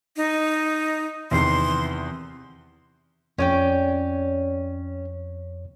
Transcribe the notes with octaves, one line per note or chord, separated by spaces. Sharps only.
D#4
E2 C3 D#3 C6
F2 C#4 C#5 D5 G5 C#6